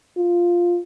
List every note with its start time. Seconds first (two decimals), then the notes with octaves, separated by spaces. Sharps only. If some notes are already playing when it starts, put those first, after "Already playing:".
0.17 F4